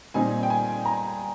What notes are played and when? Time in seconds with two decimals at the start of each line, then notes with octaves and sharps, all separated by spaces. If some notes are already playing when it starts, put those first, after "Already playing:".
0.14 A#2 G3 C4 D#4 G#5
0.43 G5
0.50 G#5
0.85 A#5